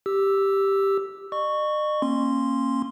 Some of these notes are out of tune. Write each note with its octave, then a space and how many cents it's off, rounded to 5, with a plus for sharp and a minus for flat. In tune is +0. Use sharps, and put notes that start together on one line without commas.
G4 +0 E6 +0
D#5 -45 C#6 +0
A#3 +0 C#4 -30 C6 +0